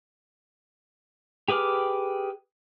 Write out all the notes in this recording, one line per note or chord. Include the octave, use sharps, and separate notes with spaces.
G4 G#4 B4 D6 F6